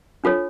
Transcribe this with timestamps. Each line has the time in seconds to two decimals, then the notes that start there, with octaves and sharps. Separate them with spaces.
0.24 D4 F4 A4 C#5